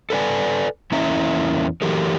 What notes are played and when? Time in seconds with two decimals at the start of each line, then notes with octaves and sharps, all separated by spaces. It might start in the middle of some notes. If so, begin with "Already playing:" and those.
0.10 A4 B4 D5 G#5
0.92 E2 A#3 C#4 E4 E5 A#5
1.82 E3 F#3 A3 G4 A#4